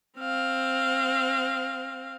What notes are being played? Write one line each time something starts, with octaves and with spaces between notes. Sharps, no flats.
C4 F5